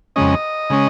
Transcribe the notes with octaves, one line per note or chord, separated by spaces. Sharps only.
F2 C#3 G#3 C#4 D#5
C#3 G#3 C#4